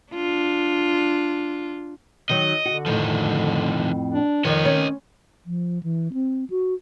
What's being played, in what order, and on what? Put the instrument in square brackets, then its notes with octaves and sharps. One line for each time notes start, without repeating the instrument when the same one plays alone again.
[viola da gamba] D4 F4
[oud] D#3 F#3 [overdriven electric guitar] D#5
[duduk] D3 [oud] F#4
[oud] F2 A2 [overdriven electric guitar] D#3 F3
[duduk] D4
[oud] F2 F3 [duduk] D#3 [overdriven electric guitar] C#5 D#5
[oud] C#4
[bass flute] F3
E3
C4
F#4